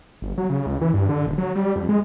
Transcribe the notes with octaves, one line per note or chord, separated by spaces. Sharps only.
G1
F#3
C#3
C#2
E3
G2
D3
D#1
F#3
G3
F2
G#3